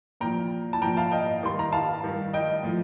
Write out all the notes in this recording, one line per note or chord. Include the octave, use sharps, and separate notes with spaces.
A#2 F3 G5 A#5
A5
A#2 F3 G5 A#5
F5 A5
D#5 G5
G2 D#3 G3 C6
A#5
F5 A5
G2 D#3 G3
D#5 G5
A2 F3